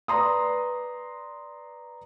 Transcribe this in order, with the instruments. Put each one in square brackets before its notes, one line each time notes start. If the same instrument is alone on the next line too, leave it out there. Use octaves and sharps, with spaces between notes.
[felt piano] B4 D5 A#5 C6 D#6